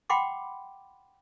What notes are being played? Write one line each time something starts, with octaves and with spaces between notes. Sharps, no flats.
F#5 G5 B5 C6 D6